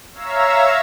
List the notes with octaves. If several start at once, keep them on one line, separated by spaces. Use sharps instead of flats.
C#5 E5 F5 A#5 E6